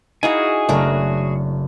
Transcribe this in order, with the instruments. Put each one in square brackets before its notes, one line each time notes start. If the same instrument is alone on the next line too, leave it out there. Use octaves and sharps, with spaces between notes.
[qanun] D#4 E4 F5 [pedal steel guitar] F#4 G#4 G#5
[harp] F#1 C#3 [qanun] A3 D4 A#4